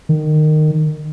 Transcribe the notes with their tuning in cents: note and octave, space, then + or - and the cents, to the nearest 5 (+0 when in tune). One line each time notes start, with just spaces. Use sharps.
D#3 -20